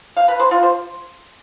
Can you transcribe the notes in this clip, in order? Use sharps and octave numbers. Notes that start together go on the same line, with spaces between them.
F5
B4
C5
F4
C5